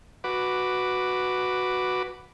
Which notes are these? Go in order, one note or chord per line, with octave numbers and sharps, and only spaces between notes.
F#4 B4 D6